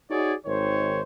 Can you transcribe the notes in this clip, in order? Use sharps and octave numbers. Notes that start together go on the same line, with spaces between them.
D#4 F#4 G#4 C#5 D5
G#1 D#3 C5 C#5